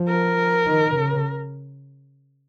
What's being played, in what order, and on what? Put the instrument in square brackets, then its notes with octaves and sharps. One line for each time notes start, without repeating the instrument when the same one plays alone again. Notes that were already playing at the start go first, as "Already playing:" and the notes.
Already playing: [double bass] F3
[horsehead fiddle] A#4
[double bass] D#3
C#3